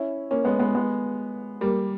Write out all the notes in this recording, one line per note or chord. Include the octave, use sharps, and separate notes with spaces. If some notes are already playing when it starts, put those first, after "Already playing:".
Already playing: C#4 E4
A#3 C#4
G#3 B3
G#3 B3
G#3 B3
G3 A#3